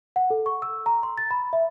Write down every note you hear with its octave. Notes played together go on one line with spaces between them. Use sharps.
F#5
A4
C#6
E6
A#5
C6
A6
B5
E5